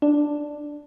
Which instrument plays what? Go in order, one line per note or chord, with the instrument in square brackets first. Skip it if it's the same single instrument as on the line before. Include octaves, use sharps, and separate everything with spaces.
[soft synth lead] D4